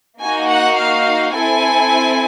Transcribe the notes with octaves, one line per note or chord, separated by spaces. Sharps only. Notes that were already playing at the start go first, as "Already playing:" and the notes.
A#3 D#4 F#4 G#5
F#5
F5
C4 E4 A4 G#5